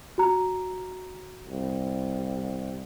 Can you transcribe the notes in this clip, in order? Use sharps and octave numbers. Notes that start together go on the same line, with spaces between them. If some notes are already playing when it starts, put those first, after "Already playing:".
F#4 A#5
C2